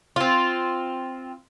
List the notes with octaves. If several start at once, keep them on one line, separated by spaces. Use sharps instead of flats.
C4 F4